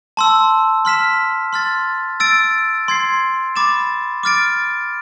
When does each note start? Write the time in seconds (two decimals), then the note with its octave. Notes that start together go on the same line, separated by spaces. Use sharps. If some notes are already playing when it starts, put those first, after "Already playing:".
0.17 A5 C6 E6
0.85 C6 F6 B6 E7
1.53 C6 F6 A6
2.20 E6 A6 D7
2.88 C6 G#6 C7
3.56 B5 D6 A6 E7
4.23 D6 F6 A6 D7